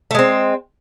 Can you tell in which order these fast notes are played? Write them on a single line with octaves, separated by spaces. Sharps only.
A3 G#3 C4